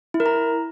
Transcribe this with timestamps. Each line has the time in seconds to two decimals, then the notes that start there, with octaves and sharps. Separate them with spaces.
0.14 E4
0.20 A#4
0.26 A#5